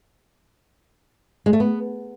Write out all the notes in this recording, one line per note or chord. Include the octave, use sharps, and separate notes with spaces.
G#3
A3
B3